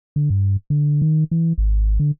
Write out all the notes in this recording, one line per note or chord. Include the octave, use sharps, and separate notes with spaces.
D3
G2
D3
D#3
E3
G#1
D3